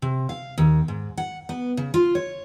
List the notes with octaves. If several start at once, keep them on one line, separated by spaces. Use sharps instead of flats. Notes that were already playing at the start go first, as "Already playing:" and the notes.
C3
F5
D#2
G#2
F#5
B3
C#3
F4
C#5